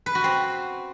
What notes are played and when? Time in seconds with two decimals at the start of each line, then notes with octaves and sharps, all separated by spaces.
0.06 B4
0.15 F#4
0.24 C4